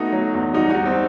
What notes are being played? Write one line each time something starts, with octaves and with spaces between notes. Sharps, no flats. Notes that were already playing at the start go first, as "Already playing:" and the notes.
Already playing: A3 B3 D#4 F#4
F#3
E2
G3 D#4 F#4
G3 D#4 F#4
C4